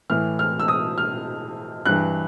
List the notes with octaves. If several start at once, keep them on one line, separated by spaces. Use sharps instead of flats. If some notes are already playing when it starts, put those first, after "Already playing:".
A2 E3 F6
F6
E6
D#6
F6
G2 E3 F#6